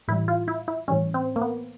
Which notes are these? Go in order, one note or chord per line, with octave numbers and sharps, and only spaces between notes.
A2 E3 G3 E4
F4
E4
E4
A2 E3 G3 C#4
C4
A#3
B3